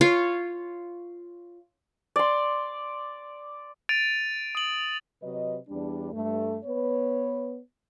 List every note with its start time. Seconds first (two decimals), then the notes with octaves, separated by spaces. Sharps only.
0.01 F4 C#5 F5
2.16 D5 C6
3.89 A6 D7 D#7 F7
4.55 D#6 F#7
5.23 C3 F#3 B4 D#5
5.69 E2 G3 D4
6.13 G2 A3
6.64 B3 B4 C#5